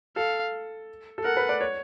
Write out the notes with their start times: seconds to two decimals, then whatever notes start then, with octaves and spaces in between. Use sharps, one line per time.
0.16 A4 F5
1.18 A4
1.24 A#4 F#5
1.37 B4
1.49 D5
1.60 C#5